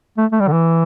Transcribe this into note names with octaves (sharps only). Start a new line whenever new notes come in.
A3
A3
G3
D3
E3